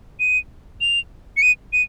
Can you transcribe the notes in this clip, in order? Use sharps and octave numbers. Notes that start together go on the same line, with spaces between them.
D#7
F7
C#7
D#7
D#7